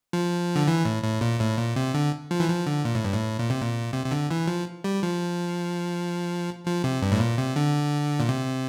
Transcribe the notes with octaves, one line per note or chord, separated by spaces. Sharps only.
F3
D3
E3
A2
A2
A#2
A2
A#2
C3
D3
F3
E3
F3
D3
A#2
A2
G2
A2
A#2
C3
A#2
C3
C3
D3
E3
F3
G3
F3
F3
C3
G2
A2
A#2
C3
D3
A#2
C3